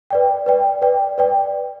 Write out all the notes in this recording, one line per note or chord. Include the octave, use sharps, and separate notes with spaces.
B4 D5 G5
B4 D5 G5
B4 D5 G5
B4 D5 G5